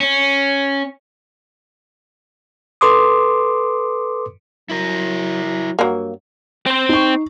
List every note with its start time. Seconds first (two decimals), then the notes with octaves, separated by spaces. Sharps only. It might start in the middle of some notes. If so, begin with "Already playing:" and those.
0.01 C#4
2.81 A4 B4 C6 D6 D#6
4.70 F#3 E4 A#4
5.45 F#3
5.79 G2 F#3 A#3
6.66 C4 C5
6.89 D#4 C#6